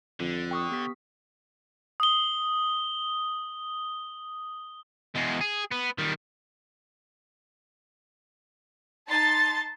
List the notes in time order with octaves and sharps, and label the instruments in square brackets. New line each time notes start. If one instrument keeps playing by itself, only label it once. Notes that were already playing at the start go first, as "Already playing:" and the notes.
[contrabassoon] F2 [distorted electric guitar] D3
[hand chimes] G5 C#6 D#6
B3 G4 B6
[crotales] D#6 G7
[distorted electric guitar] E2 G#3
G#4
B3
D#3 G3
[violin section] D#4 A5 C6 A6